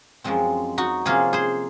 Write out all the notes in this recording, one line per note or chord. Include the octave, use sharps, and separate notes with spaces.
F#2 F3 G#3 C4
D#4 F#4
C3 F3 A#3 C#4 F4 G#4
G#4 C5